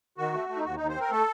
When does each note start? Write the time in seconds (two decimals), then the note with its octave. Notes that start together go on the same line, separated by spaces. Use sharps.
0.18 D#3 F#4
0.34 A3
0.49 A3
0.56 D#4
0.65 D#2 F#4
0.77 D#2 D#4
0.89 C5
0.96 C4 A#4
1.11 A3 A4